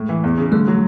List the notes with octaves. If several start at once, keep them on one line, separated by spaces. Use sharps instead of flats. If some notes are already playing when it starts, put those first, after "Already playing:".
Already playing: A2 G#3
E3
E2
C#3
D3 G3 A3
F#3